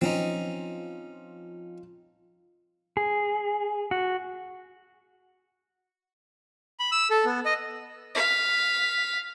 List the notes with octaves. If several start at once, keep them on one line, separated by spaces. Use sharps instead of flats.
F3 C4 C#4 D#4
G#4
F#4
B5
E6
A4
B3
D#5
F5 B6